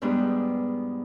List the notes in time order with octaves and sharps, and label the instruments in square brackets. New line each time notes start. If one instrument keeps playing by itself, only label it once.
[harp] E2 G#2 G3 B3 D4